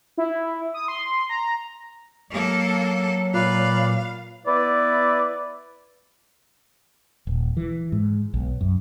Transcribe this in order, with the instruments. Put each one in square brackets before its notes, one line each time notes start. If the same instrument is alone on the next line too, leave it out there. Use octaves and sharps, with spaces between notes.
[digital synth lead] E4
D#6
C6
A#5
[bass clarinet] F#3 [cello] A#3 A4
[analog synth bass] A#2 [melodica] B4 D5 [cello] F5
[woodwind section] B3 E4 B4 D5
[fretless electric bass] D#1
E3
G#2
B1
F#2